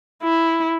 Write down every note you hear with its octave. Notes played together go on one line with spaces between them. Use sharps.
E4